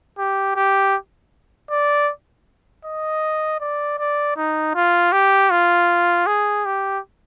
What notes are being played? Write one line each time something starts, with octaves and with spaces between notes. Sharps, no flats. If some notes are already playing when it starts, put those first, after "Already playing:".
G4
G4
D5
D#5
D5
D5
D#4
F4
G4
F4
G#4
G4